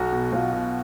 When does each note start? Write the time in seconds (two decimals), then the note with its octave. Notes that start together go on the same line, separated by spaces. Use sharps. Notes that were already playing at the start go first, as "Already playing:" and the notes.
Already playing: B1 F#4
0.12 B2
0.32 B1 F4
0.53 B2